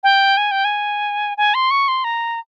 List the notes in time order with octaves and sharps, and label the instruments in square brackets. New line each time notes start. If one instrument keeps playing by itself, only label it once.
[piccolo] G5
G#5
G5
G#5
G#5
C6
C#6
C6
A#5